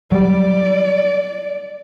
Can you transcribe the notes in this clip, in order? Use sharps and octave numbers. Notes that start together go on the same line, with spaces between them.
F#3 G3 D5